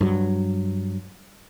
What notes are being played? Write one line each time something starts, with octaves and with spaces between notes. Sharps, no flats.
G2 F#3